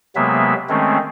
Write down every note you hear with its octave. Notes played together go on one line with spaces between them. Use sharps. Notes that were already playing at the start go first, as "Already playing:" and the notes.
C3 F#3 G#3 A#3 B3 E5
D#3 G#3 A3 C4 C#4